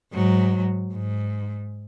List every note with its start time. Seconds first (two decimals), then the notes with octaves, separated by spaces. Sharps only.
0.13 G#2 F#3
0.93 G#2